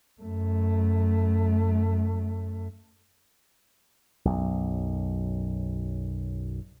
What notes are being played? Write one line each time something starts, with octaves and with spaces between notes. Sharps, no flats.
F#2 A3
B1 F#2